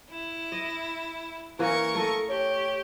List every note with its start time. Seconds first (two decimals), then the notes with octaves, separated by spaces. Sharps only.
0.10 E4
0.52 D#5
1.59 E3 A#3 C#4 A#4 C#6
1.95 A3 A4 D#5
2.30 G4 C#5